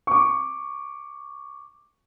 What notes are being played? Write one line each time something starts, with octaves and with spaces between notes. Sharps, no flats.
C#6 D6